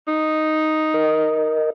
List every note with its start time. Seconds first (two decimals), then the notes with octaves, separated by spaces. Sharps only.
0.08 D#4
0.94 A#4 D#5